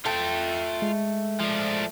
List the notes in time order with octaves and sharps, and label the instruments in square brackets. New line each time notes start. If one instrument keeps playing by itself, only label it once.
[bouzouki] A3 [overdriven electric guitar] F4 G5
[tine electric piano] G#3
[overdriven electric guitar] F3 D4